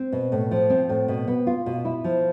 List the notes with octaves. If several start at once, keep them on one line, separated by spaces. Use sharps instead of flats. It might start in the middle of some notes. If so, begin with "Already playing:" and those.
Already playing: C4
B2
A2
F3
C4
A2
B2
B3
F4
B2
E4
F3